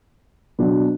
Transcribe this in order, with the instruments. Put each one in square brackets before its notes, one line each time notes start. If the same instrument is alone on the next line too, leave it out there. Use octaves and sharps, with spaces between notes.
[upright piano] B2 F#3 B3 D4